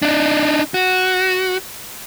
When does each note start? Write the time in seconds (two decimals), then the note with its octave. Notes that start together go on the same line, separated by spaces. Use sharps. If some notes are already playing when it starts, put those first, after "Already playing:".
0.02 D4 D#4
0.74 F#4